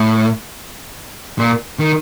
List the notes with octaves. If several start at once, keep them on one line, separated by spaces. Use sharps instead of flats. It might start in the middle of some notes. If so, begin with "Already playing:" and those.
Already playing: A2
A#2
D#3